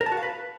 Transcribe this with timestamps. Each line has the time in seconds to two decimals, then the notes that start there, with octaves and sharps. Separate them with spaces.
0.01 A#4
0.06 A5
0.12 F#4
0.17 F5
0.23 B4